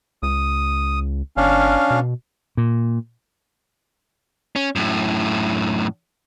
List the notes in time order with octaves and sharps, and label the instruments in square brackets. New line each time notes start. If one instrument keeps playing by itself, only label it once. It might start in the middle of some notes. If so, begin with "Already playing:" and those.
[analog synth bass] C#2 [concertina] D#6
[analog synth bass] G1 [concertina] C#4 D4 F5
[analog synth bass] B2
[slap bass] A#2
[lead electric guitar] C#4
F#2 A2